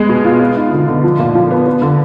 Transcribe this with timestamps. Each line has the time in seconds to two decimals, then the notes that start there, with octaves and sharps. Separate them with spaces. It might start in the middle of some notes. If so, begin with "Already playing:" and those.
Already playing: G#3 B3
0.09 B2
0.25 F4
0.41 B3
0.56 D#4
0.72 D3
0.88 D3
1.04 F3
1.19 A#2
1.35 F3
1.51 B3
1.66 B3
1.82 D3